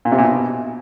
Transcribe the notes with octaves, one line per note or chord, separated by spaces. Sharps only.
A#2
C3
A#2
B2